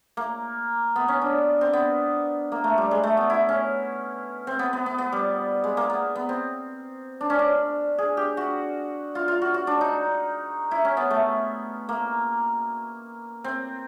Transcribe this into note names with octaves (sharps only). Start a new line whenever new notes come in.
A#3
B3
C#4
D4
C4
B3
A#3
A3
G3
G#3
A3
B3
E4
C#4
C4
B3
B3
B3
B3
G3
G#3
A#3
B3
B3
C4
D4
C#4
D4
G#4
G4
F#4
F4
F4
F#4
F#4
D4
D#4
E4
C#4
B3
A3
A#3
C4